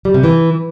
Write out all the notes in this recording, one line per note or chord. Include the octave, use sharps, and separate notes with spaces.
G3
C3
E3